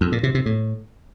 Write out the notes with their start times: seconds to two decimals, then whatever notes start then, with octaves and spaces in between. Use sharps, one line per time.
0.01 F2
0.12 A#2
0.23 C3
0.35 C3
0.46 A2